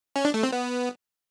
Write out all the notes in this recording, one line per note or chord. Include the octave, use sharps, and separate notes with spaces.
C#4
D4
A3
C4
B3